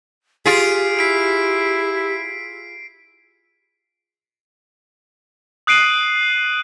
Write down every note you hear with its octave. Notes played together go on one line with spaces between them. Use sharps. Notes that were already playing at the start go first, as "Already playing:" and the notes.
F4 G4 G#4 B6 C7 D7
E4 B6 D7
D#6 F#6 C7 D7 D#7 F#7